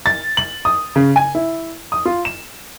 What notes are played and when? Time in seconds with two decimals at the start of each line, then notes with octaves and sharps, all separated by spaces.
0.06 A6
0.37 F#7
0.65 D#6
0.96 C#3
1.16 G#5
1.35 E4
1.92 D#6
2.06 F4
2.25 E7